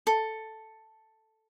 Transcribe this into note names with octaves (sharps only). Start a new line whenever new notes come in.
A4